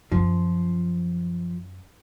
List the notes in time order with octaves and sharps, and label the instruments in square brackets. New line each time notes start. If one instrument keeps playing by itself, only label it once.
[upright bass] F#2 F4 [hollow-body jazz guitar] F3